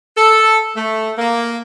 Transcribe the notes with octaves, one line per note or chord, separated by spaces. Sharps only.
A4
A3
A#3